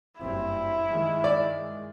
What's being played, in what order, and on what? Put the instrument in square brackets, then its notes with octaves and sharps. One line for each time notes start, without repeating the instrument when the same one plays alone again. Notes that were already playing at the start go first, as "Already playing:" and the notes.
[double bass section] F#1 G2 C4 [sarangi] E4
[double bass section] D#3 G#3
[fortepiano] D5